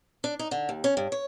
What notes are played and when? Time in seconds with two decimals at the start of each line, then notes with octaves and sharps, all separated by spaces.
0.24 D4
0.39 D#4
0.51 D3
0.69 D#2
0.84 C#4
0.97 G2
1.12 C#5